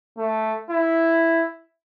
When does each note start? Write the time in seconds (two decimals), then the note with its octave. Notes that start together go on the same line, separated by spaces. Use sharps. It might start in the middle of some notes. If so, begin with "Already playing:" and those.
0.18 A3
0.70 E4